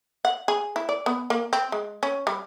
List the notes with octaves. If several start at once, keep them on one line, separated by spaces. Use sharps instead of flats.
F#5
G#4
E4
D5
B3
A#3
C4
G#3
C#4
G3